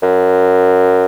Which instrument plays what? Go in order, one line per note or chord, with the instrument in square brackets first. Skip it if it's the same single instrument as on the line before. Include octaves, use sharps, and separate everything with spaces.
[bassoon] F#2